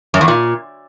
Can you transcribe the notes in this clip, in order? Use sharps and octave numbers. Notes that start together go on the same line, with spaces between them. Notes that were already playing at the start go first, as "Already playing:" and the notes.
F#2
E2
A#2